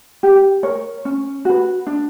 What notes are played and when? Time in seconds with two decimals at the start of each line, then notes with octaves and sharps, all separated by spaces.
0.23 G4
0.63 A#4 C#5
1.05 C#4
1.45 F#4 B4
1.87 D4